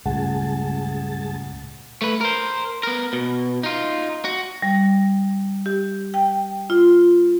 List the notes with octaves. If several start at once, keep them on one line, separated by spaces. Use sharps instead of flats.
C#2 G2 A#2 A3 G#4 F#5 A5
A3 B4
A#4 C5
B3 A#4
B2
D#4 F4
F#4
G3
G4
G5
F4